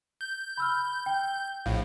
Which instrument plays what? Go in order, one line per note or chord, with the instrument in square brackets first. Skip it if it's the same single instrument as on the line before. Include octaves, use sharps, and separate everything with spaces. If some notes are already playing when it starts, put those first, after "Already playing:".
[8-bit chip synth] G6
[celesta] B5 E6 F6
G5
[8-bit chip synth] A#1 A2 [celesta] F5